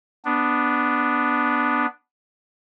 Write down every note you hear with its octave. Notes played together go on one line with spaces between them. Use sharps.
B3 D4